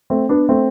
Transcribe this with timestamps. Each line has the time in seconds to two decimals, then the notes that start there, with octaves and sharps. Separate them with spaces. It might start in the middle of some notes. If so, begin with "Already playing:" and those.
0.10 A3 C4
0.29 B3 D4
0.49 A3 C4